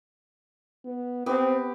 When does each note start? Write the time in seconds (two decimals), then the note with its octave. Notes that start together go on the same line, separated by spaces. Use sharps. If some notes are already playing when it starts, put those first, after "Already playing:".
0.85 B3
1.26 B3 C4 G4